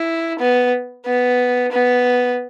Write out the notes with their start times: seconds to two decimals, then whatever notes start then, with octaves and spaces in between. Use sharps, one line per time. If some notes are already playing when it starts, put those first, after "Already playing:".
Already playing: E4
0.39 B3
1.06 B3
1.72 B3